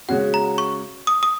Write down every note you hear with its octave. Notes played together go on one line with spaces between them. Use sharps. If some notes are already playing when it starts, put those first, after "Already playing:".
C#3 G#3 C#4 F#4 F#5
A#5
C#6
D#6
D#6